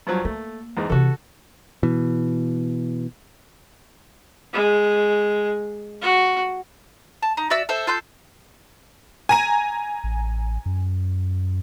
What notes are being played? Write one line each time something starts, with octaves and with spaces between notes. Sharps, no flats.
G2 F3 F#3
A3 A#3
E2 G#2 G#3
C3 E3 F#4 A4
B2 E3
G#3
F#4
A5
D#4 A#5
F#4 D5 E5 E6
A4 C5 E5
F4 A4 C6 G6
G#5 A#5 D#7
A1
F#2